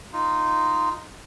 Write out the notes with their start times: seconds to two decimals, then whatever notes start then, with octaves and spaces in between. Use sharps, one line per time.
0.13 D#4 F4